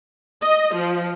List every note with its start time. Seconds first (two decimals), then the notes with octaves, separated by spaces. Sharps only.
0.42 D#5
0.75 F3